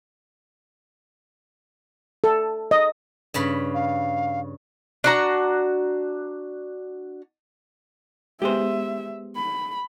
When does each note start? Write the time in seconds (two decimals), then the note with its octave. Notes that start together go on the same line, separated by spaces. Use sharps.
2.24 A4
2.71 D#5
3.34 G2 C#3 B5
3.74 F5
5.04 D4 F#4 A#5
8.42 G#3 B3 G4 G#4 C5 E5
9.36 B5